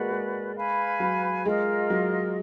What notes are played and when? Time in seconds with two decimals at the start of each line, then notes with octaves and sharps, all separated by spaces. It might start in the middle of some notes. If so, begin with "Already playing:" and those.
Already playing: G#3 A#3 F#4 B4 D5
0.11 G#3
0.56 B4 F5 G#5 B5
1.00 F#3
1.45 G#3 F4 A#4 D#5
1.90 F#3